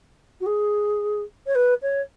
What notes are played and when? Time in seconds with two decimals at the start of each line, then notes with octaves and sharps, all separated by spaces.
0.41 F#4
0.46 G#4
1.47 C#5
1.55 B4
1.82 C#5